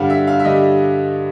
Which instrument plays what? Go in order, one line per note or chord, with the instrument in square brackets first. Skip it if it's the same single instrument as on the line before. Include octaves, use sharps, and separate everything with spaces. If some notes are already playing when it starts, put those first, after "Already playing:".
Already playing: [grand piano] G2 D3 G3 F5 F#5
E5
F5
E5
D3 G3 D#5